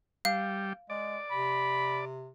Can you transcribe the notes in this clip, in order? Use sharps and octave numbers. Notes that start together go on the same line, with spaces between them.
G3 F5
G#3 D5
C3 B5